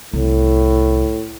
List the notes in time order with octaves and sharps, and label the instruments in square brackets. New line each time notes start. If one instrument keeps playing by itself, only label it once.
[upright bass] C2 [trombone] A2